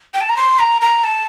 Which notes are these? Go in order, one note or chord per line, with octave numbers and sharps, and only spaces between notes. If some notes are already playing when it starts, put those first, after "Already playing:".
G5
A5
A#5
C6
A#5
A#5
A5